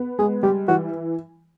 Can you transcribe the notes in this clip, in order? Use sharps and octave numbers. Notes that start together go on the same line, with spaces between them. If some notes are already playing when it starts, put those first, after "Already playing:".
Already playing: B3
G#3 G#4
G3 G4
E3 F#4